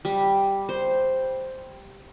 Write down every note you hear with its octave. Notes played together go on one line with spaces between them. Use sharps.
G3
C5